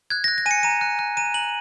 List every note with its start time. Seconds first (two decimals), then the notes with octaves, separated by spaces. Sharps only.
0.10 F#6 G#6
0.24 A#6
0.28 F#6
0.38 A#6
0.46 G#5 D#7
0.51 C#7
0.63 A#5 D#7
0.81 F#6
0.99 F#6
1.17 A#5 D#7
1.34 A#5 F#7